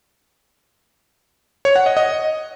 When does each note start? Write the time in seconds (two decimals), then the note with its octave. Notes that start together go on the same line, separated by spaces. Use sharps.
1.65 C#5
1.76 F#5
1.86 D#5
1.97 D#5